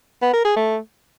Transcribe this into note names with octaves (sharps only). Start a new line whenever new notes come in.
B3
A#4
G#4
A3